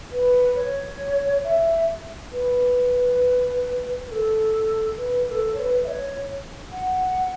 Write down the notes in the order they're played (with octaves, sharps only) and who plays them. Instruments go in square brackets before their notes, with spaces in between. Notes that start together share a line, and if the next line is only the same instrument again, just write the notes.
[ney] B4
C#5
E5
B4
B4
A4
B4
B4
A4
C#5
B4
E5
C#5
F#5